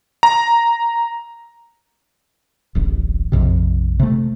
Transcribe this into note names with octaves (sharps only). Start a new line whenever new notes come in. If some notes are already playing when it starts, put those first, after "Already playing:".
A#5
D1 A1
A#1 F2 C3
C3 A3